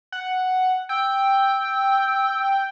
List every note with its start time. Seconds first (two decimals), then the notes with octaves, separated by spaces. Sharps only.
0.12 F#5
0.89 G5 E6